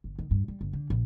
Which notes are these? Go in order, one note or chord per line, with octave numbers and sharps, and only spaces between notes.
G1
D#3
G2
G3
G1
D3
A#1